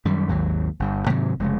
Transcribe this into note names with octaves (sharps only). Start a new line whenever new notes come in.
F#2 D#3 G3
G#1 D#2 F#3
G1 G2
G#2 C3 D#3 F#3
F1 C#3 G#3